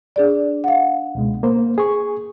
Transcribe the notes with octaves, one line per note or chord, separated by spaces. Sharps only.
D4 G#4 D5
F5 F#5
C#2 B2 G#3
A#3 C5
G#4 C#6